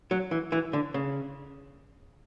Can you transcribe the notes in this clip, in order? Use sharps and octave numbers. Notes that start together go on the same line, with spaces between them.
F#3
E3
E3
D3
C#3